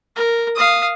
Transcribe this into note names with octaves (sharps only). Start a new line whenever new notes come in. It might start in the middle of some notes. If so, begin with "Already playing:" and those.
A#4
F5 D#6